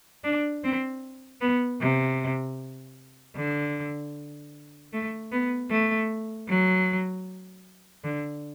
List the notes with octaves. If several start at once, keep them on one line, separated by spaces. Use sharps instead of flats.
D4
C4
B3
C3
D3
A3
B3
A3
F#3
D3